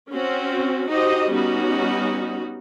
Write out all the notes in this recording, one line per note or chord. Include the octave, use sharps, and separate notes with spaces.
C4 C#4 F#4
D#4 F#4 G4 C5 D#5
G3 B3 C#4 D#4 F#4